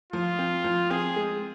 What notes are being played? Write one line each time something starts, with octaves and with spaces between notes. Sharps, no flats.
F3 F4
C4
F3
C4 G#4
G#3